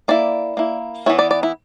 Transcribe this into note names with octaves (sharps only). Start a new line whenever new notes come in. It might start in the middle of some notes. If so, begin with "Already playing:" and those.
A#3 E4 D5
A#3 E4
E3 B3 E4 C#5
D5
D5
E4